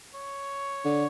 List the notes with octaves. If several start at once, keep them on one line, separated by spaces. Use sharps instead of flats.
C#5
D3